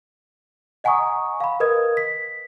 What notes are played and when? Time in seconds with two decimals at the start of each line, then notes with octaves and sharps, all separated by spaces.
0.84 D#5 F#5 G#5 A#5 C#6 D#6
1.40 F5 B5
1.60 A#4 B4 D#5 D#6 G#6
1.97 B6